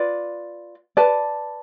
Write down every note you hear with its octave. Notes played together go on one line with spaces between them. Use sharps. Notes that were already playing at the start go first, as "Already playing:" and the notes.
Already playing: F4 B4 D5
B4 D5 A5